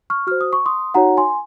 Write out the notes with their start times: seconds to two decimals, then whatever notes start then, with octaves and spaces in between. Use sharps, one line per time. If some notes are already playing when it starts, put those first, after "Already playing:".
0.10 C#6 F6
0.27 F#4 C5 F6
0.41 D#6
0.53 C#6
0.66 C6 D#6
0.94 D#4 F#4 C#5 F#5 A#5
1.17 G#5 C6